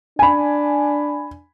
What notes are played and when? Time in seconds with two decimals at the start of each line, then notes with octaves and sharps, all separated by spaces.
0.19 D4 G#5 B5